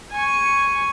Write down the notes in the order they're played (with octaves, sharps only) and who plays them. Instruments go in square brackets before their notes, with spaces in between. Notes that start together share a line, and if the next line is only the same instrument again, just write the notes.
[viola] G#5 C#6